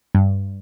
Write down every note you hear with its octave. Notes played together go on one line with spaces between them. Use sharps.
G2